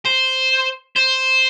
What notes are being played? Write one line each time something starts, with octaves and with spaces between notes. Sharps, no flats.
C5
C5